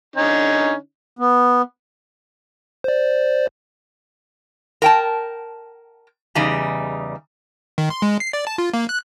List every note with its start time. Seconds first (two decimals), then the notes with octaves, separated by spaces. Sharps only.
0.16 D3 C#4 D#4
1.19 B3
2.84 C5 D5
4.82 A#4 G5 A5
6.35 E2 C#3 G3 D#4
7.78 D#3
7.90 C6
8.02 G#3
8.20 C7
8.33 D5
8.47 A5
8.58 F4
8.73 A#3
8.89 F#6